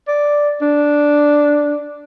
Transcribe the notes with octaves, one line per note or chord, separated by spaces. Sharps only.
D5
D4